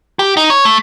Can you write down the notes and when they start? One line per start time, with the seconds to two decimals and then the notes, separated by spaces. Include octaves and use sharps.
0.19 G4
0.37 D#4
0.50 C#5
0.65 A3